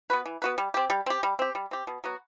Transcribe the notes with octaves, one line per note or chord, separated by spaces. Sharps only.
B3 F#4 B4
E3
B3 F#4 B4
G3
C4 G4
G3
C4 G4
G3
C4 G4
G3
C4 G4
B2
F#3 B3 F#4